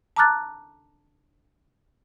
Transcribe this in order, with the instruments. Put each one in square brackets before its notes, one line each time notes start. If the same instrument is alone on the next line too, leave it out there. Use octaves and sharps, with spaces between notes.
[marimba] A5 A#5 D6 F6 F#6 A6